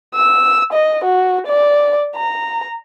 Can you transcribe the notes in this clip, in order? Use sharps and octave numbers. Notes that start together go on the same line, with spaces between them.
E6
D#5
F#4
D5
A#5